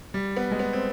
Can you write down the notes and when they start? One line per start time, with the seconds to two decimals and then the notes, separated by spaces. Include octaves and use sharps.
0.14 G3
0.37 B3
0.51 G#3
0.59 B3
0.73 C4